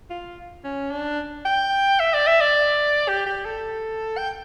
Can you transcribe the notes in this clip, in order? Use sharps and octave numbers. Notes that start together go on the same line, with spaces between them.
F4
C#4
D4
G5
E5
D5
E5
D5
G4
G4
A4
G5